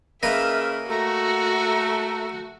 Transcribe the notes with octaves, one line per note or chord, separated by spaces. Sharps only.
C#3 A#3 A#4 B4 D#5 E5
A3 F#4 A#5